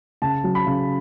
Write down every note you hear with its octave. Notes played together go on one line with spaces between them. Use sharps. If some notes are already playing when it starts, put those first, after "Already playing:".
C#3 A5
F#3
B5
C#3